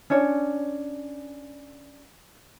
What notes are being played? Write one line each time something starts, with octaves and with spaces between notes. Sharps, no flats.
C#4 D4 C#5